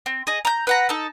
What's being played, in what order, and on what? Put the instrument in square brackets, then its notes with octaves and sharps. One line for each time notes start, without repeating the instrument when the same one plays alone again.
[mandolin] C4
G#4 D#5
A#5 G6
B4 F#5 A#5
D#4 A4